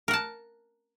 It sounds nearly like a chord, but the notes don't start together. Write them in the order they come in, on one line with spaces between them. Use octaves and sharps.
A#4 F#5 A5